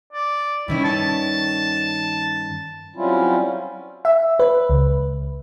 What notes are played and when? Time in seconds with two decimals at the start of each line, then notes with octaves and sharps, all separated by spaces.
0.13 D5
0.68 G2 D#3 C#4 E4
0.84 A5
2.96 F#3 G3 C4 C#4 E4 F4
4.05 E5
4.39 B4
4.69 C#2